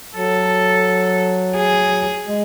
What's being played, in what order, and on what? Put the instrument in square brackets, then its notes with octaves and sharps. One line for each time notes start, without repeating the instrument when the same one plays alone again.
[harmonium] F#3 [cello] A4
[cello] G#4
[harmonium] G#3